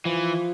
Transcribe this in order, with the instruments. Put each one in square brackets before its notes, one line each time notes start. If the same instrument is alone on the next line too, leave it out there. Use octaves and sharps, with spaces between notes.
[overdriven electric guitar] E3 [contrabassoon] F3